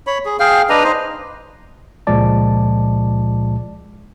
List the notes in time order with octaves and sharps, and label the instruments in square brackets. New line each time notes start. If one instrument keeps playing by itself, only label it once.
[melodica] C#5 B5
G#4
G#4 F5 G5
D4 B4 D#5 A#5
D#4 C5
[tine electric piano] C#2 A#2 F3 G#3 D5 A5